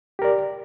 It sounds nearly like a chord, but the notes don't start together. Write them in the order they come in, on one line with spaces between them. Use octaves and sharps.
G4 A#4 D5